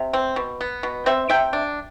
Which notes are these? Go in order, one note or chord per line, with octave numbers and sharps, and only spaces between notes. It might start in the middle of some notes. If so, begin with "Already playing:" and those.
Already playing: C3
C4
B2
B3
B2
C4 C5 E5
C3 E5 G5
D4